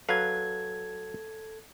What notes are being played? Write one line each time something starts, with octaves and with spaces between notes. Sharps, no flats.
F#3 A4 B4 F5 G#6